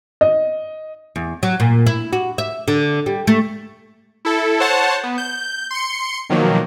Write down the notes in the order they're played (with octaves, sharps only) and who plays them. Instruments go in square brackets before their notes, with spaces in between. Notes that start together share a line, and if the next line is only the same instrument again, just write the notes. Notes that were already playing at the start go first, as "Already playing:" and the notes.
[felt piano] D#5
[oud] E2
F#3
A#2
E4
F#4
E5
D3
G3
A3
[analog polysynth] E4 A4
C5 C#5 F#5 A5
B3
G6
C6 C#7
B2 D#3 F3 F#3 A#3